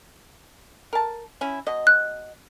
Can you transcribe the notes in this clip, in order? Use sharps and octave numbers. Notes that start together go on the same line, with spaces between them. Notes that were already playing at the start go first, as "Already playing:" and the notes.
A#4 A5
C#4 E4
B2 D#5
F#6